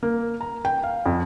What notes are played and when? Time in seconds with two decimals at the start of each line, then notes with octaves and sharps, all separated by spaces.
0.03 A#3
0.41 A#5
0.65 G5
0.84 F5
1.06 F2